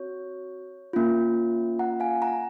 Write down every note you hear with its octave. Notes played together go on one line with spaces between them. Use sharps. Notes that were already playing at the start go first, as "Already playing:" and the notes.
Already playing: C4 F#4 C#5
A#3 C#4 F4
F#5 A#5
F5 G#5
F#5 A#5